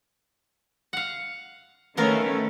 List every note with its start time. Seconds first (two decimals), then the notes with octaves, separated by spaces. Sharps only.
0.93 F5 F#5
1.97 D#3 A3 B3 C#4 A#4 F5